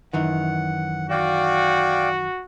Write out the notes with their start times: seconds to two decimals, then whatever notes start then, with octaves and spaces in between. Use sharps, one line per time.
0.13 F#2 D#3 E3 F#5
1.10 F#4 D5 F5 G5